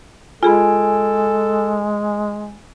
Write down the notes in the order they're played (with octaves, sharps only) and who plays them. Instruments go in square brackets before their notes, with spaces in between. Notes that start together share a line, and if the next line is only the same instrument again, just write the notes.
[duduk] G#3 [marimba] F4 G#4 B5 [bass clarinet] A4 [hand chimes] G#5